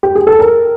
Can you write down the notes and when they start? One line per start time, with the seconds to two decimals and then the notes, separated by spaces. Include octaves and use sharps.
0.03 G4
0.15 G#4
0.27 A4
0.39 A#4